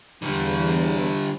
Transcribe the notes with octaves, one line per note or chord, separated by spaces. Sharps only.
E2 D3 G3